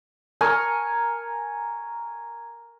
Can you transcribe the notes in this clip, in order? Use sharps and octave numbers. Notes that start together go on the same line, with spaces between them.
A#4 G#5 A#5 C#6